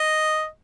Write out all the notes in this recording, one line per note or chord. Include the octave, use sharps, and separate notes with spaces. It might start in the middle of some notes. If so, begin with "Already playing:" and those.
Already playing: D#5